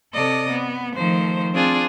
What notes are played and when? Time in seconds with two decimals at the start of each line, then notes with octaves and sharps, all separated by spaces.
0.13 C3 A4 D5 D#5
0.49 B3
0.95 D#3 F3 A3 C5
1.53 C4 D4 F4 G#4